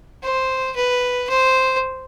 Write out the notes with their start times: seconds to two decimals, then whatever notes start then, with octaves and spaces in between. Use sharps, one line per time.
0.23 C5
0.76 B4
1.30 C5